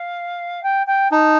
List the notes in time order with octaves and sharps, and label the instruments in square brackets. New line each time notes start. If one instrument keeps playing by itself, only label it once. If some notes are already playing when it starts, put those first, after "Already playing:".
Already playing: [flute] F5
G5
G5
[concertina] D#4 [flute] A5